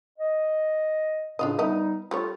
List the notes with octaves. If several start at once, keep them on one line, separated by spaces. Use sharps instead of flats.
D#5
A2 C#3 D4 F4 D#5
G3 B3 D#4 D#5 E5
G3 A3 D4 F4 C#5